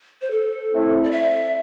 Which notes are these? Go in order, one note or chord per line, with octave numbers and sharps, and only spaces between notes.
C5
A4
A3 C4 E4
D5
E5